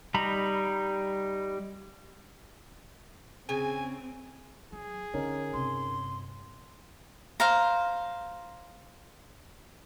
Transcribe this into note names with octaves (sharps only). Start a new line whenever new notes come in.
G3 D#4 A#5 B5
C#3 C4 G#5
F#3 G#4
D3 C#4 D#4 A#4
G2 C3 C6
C5 F5 A#5